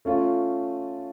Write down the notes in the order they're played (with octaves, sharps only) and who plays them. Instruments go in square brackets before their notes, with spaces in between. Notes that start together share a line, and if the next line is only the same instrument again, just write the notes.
[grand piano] A3 C#4 F4